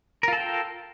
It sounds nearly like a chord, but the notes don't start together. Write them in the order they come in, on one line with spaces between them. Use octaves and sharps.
A#4 F4 A4 G5